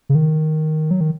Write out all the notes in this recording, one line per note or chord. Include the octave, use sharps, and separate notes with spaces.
C#3
D#3
F#3
D#3